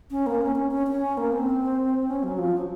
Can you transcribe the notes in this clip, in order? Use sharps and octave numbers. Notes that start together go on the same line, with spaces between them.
C#4
A#3
C#4
C#4
C#4
C#4
A#3
C4
C#4
F#3
F3
F#3